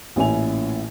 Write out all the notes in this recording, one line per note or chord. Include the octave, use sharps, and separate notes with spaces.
A1 A#2 C#4 E4 G#5 F7